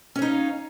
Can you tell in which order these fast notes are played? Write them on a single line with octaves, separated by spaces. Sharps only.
C#4 C#5 D#4 F5